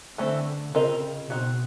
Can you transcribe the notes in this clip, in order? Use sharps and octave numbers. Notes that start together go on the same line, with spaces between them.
D3 E3 A3 C4
C#3 C4 F4 A#4 D#5
B2 C4 D#4 F#4